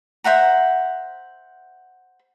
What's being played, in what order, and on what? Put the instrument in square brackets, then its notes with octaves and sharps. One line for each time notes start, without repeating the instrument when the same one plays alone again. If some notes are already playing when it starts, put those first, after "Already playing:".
[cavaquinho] C5 E5 F#5 A#5